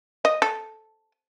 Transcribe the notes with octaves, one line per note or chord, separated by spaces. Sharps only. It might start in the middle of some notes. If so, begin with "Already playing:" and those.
D#5
A4